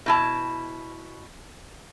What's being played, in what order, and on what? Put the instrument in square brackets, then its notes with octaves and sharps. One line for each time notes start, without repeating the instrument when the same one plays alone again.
[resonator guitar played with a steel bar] B2 E4 A5